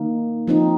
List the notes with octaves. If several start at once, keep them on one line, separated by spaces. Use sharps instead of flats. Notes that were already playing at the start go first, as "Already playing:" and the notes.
Already playing: D#3 A#3 D#4
F3 C4 D#4